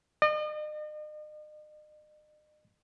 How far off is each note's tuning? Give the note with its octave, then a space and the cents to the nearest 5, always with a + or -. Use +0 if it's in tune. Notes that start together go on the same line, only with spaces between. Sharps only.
D#5 -40